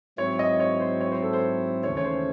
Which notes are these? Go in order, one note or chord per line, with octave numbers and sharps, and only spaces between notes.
G#2 F#3 C4 E4 C#5
D#5
C#5
C5
C#5
C5
A4
C5
D#2 C#3 E3 A3 C#4 C#5
C#5
C5